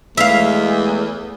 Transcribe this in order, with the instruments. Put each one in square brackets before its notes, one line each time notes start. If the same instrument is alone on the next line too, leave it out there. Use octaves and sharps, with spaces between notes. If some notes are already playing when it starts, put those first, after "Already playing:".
[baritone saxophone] E2 [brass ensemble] G#3 A3 [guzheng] E5 F5